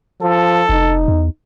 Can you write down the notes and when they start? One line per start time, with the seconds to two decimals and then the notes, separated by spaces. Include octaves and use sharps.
0.22 F3 A4
0.69 F1 D#4
1.08 E2